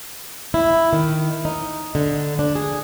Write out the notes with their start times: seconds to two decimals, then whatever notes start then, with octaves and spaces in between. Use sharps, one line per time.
0.54 E4
0.93 D#3
1.45 D#4
1.95 D3
2.39 D4
2.55 G#4